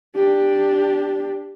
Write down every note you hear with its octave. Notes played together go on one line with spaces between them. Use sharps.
D4 G4